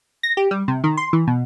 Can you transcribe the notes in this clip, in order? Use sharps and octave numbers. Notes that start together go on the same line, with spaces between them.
A#6
G4
G3
C3
D#3
C6
E3
B2